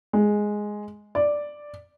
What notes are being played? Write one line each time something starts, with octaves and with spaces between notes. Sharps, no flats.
G#3
D5